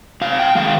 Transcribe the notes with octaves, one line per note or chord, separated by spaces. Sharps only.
C3 F5
G5
D#3 G#3 F5